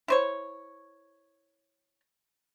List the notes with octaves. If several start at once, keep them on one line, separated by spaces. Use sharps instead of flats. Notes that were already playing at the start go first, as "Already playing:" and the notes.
E4 C5 C#5